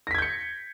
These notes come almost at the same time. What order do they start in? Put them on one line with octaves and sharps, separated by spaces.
A#6 B6 G#6 G6 C#7